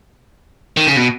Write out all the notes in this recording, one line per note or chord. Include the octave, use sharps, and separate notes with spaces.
D#3
C#3
B2